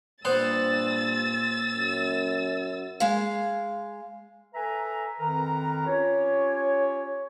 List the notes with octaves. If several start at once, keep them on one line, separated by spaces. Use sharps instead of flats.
G2 A#2 B3 C5 F#5 E6 A6
F#2
G#3 F5
A4 B4 E5 G#5 A#5
F2 D#3 A#4 B4 A#5
C#4 F4 G4 C#5